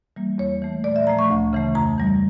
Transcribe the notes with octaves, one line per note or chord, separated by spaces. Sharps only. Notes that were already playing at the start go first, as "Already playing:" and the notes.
E3 G3 A#3
E2 C#5
E3 A3
A#2 D5
E5
F3 A3 A#5
C#6
D2
C#3 E3 A3
F2 A#5
E3 G3